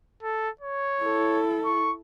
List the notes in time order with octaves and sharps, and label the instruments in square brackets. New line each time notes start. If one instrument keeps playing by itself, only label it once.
[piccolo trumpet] A4
C#5
[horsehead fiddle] E4 A4
[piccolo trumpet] C#6